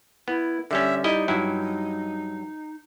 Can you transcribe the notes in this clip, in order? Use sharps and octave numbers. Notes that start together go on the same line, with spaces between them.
B3 E4
D3 G3 C#4 E5
G3 D#4 E4 D#5
G2 F#3 D#4 E4